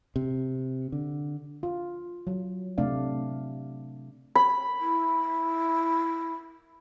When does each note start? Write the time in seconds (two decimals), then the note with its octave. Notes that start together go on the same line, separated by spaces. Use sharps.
0.16 C3
0.92 D3
1.63 F4
2.27 F#3
2.78 C3 A3 D4 D5 F5
4.35 B5
4.80 E4